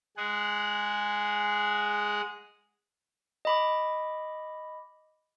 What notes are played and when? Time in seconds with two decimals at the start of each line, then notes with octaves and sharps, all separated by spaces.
0.17 G#3 G#4 F#5
3.45 D#5 B5 D6